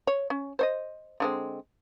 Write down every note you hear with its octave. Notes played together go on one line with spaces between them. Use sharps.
C#5
C#4
C5 C#5 D#5
D3 G#3 C4